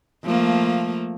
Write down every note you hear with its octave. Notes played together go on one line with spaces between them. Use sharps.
F3 A3 A#3